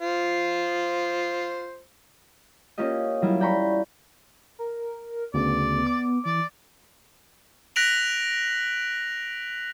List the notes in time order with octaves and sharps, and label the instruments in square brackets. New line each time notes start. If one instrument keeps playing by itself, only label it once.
[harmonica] F4 C5
[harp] A#3 C#4 F4 G4 D#5
F#3 G3 E4 F4
D5 G5 A#5 B5 C#6
[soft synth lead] A#4
[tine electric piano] D2 C#3 [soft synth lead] B3 [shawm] D5
[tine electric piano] D6
[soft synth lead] E3 [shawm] D5
[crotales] F#6 A#6 B6 D7 F7 F#7